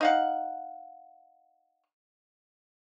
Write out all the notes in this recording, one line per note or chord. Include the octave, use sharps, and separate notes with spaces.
D#4 F5 F#5